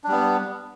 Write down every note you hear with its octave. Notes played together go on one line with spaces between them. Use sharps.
G3 B3 D4